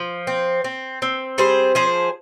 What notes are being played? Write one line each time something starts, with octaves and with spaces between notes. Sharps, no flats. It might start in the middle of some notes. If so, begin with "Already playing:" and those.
Already playing: F3
C4
C4
C4
G3 G#4 C5
F3 G#4 C5